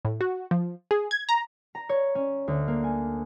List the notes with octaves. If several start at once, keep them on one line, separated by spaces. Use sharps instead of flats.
A2
F#4
F3
G#4
G#6
A#5
A#5
C#5
C#4
D2
A#3
G#5